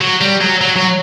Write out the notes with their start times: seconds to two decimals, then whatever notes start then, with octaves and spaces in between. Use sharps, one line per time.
0.01 F#3
0.21 G3
0.41 F#3
0.61 F#3
0.76 F#3